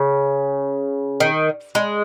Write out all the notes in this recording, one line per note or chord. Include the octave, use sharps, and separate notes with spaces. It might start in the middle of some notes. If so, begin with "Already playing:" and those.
Already playing: C#3
D#3
G#3